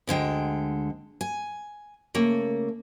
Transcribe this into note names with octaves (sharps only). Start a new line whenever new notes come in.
D2 D3 G#3 G5
G#5
C#3 A3 A#3